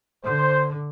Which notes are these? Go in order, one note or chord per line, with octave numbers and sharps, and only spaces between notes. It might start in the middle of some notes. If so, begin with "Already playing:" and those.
D3 C5